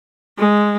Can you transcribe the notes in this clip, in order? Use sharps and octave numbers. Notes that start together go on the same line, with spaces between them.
G#3